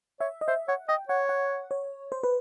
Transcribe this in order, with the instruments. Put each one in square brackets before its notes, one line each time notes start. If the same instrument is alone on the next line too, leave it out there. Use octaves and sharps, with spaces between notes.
[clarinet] C#5 [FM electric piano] E5
[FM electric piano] D#5
[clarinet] C5 [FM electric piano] E5
[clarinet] C#5 [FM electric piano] F#5
[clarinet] D#5 [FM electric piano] G5
[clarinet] C#5 [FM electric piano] F#5
[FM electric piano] F#5
C#5
C5
B4